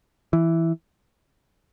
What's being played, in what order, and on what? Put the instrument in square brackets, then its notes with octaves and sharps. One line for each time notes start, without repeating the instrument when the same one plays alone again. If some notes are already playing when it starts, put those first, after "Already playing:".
[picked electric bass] E3